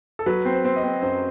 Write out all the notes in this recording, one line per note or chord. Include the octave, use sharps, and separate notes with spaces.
A4
F#3 B4
C4
C5
C4
D#5
C4
F#2 C5